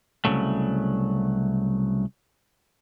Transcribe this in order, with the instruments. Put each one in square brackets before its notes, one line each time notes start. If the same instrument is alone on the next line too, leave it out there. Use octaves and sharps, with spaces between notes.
[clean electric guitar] C2 G#2 C#3 F#3 A3